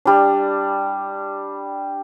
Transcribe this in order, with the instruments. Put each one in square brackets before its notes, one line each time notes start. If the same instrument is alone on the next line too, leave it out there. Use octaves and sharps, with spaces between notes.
[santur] G3 D4